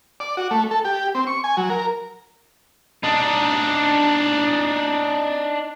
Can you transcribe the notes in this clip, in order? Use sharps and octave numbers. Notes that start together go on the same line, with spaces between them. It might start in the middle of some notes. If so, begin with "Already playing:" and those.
D5
F#4
A3
A4
G4
C4
C#6
G#5
F#3
A#4
D4 D#4